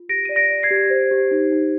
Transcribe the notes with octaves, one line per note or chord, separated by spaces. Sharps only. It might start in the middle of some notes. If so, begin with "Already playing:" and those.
Already playing: F4
G4 A#6 D7
D5 D#7
A#6 D7
D5
G#6 C7
G4
C5
G4
D#4
D#4